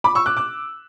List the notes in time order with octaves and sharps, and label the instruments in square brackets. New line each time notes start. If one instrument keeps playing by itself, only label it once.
[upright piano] B5 D6
C#6 E6
D6 F#6
D6 F#6